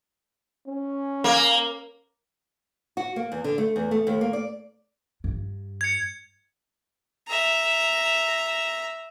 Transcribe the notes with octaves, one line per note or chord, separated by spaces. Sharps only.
C#4
A#3
F#4
A#3
E2
D3
A3
E2
A3
D#2
A#3
D5
G2
G#6 C#7
E5 A#5